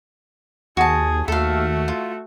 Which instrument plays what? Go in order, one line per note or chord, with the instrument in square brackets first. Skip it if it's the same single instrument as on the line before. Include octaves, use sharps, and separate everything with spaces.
[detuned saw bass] D#2 [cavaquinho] F#4 A5 [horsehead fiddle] G#4
[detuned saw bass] D#2 [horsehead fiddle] A3 F#4 [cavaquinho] A4 F5
[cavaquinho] F4